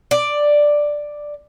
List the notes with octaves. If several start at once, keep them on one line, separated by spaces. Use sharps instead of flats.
D5